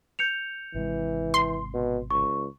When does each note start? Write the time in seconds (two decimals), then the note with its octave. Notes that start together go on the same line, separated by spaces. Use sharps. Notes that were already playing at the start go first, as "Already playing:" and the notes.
0.19 G6 C#7 F7
0.74 G#1 C3 E3 G#3
1.34 C6
1.74 B2
2.11 C#2 C#6